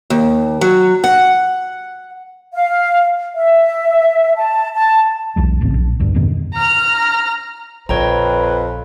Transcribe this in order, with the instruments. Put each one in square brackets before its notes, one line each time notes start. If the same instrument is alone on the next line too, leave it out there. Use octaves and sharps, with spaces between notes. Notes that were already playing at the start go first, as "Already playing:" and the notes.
[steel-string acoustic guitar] D#2
F#3
F#5
[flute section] F5
E5
A5
A5
[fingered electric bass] B1 E2 G#3
D1 A1 C#3 C4
A#1
D2 G2
F2 G#2 B2 D#3
[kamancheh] A#5 F6
[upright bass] A#1 [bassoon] F2 [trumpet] B4 [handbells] C#5 G5 A#5